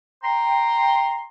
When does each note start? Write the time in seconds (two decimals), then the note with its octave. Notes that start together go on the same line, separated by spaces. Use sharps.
0.24 G5 A#5 C6